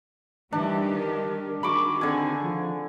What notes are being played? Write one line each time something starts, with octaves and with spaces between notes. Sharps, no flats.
D#3 E3 G3 D4 G4
A#4
D#3 F#4 G#4 B5 C#6 D6
D3 C4 G#5
F3